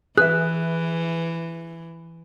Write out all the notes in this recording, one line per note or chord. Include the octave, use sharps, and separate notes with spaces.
E3 G#4 B4 E5 F#6